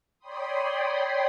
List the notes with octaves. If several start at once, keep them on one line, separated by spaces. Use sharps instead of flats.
C#5 D5 G5 B5 C6 D#6